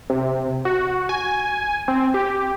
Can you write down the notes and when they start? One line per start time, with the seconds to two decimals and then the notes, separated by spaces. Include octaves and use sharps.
0.10 C3
0.65 F#4
1.09 G#5
1.88 C4
2.14 G4